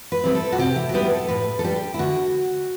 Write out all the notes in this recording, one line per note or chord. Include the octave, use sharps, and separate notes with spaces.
B4
G3 C4 E4
A4
F#4
C3 G4
E4
F#4
G3 B3 E4 G4
A4
A2 B4
A4
G3 D4 G4
E4
D3 F#4